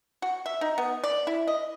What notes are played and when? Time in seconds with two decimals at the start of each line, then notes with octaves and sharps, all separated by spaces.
0.22 F#4
0.46 E5
0.61 D#4
0.78 B3
1.04 D5
1.27 E4
1.47 D#5